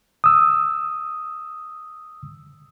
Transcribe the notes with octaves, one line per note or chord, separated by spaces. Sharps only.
D#6 E6